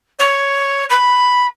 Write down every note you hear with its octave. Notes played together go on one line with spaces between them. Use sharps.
C#5
B5